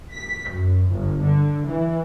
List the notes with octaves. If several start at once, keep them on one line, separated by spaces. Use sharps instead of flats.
B6
F#2
G1
D3
E3